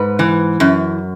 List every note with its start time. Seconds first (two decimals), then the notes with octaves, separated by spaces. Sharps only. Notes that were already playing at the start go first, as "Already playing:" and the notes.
Already playing: G#2 B4
0.19 E3
0.60 F#2